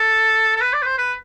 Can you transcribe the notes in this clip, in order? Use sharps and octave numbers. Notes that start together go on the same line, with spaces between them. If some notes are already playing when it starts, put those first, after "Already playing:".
Already playing: A4
A4
B4
D5
B4
C5
B4